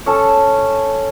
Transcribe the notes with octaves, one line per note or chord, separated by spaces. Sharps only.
C#4 A4 C#5 A5